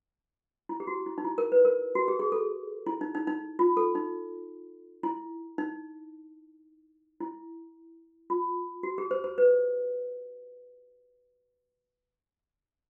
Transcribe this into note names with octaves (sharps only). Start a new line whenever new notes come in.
E4
G4
F#4
E4
D#4
E4
A#4
B4
A#4
F#4
G4
G#4
A4
E4
D#4
D#4
D#4
F4
A4
D#4
E4
D#4
E4
F4
F#4
G4
C5
C5
B4